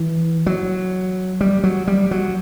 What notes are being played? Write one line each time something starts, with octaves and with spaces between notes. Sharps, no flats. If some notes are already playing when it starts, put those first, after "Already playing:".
Already playing: E3
F#3
G3
F#3
G3
F#3